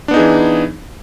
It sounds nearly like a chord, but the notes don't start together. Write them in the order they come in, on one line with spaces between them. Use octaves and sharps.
D4 B3 D#4 G#4 E3